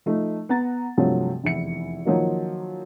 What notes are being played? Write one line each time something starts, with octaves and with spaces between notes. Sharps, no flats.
F3 A3 D#4
B3 F#5 A#5 A6
G2 C3 F3 F#3 A3
F1 E2 E4 C#7
D#3 F3 F#3 A#3 D#4